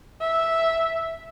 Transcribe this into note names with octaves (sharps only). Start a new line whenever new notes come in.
E5